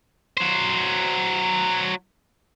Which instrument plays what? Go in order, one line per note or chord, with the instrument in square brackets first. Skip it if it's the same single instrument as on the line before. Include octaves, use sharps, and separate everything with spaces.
[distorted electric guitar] F#3 C5